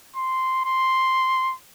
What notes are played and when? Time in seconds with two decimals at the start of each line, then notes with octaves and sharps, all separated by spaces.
0.16 C6
0.65 C6